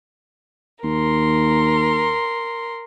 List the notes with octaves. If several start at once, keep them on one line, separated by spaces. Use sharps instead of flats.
D#2 A#4 C6